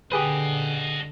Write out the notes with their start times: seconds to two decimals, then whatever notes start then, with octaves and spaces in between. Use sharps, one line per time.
0.12 D3 G4 G#4 B4 D#5 F#5